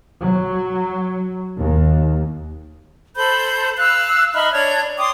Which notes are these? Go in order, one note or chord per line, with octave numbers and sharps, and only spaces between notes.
F#3
D#2
A4 C5 B5 G6
F5 E6 F#6
D#4 E5 B5 F6
D4 C#5 G#6
G5 C6 D6 D#6